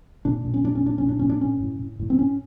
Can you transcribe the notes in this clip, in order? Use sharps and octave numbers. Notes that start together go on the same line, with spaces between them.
A#2 D4
A#2
C#4
A#2 D4
C#4
A#2 D4
A#2 C#4
D4
A#2 C#4
D4
A2 C#4
A2
A2
A2
C4
A2 C#4